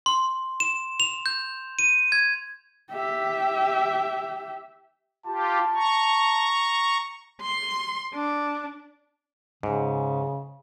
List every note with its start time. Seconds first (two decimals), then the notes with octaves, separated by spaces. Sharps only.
0.06 C6
0.60 E7
1.00 F7
1.26 G6
1.79 D#7
2.12 G#6
2.92 G4 E5
5.26 F4 G4 A5
5.75 A#5 C#6
7.41 C6
8.14 D4
9.63 G#2 C#3